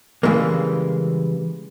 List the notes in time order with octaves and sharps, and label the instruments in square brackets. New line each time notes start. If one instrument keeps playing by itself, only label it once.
[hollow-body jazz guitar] C#3 E3 G3 G#3 A#3